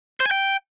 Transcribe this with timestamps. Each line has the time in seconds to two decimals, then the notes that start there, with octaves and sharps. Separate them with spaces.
0.20 C5
0.26 G#5
0.31 G5